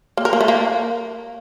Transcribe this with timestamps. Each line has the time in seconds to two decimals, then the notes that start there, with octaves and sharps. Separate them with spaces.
0.17 A#3
0.25 A#4
0.33 A#3
0.41 A3
0.48 A#3